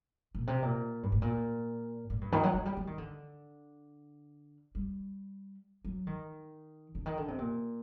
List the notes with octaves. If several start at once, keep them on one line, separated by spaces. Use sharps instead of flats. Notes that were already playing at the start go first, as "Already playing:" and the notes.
A#2
C3
A#2
G2
A2
A#2
A2
G2
D#3
F#3
F#3
G3
F#3
D#3
D3
G3
F#3
D#3
D3
D#3
D3
C3
A#2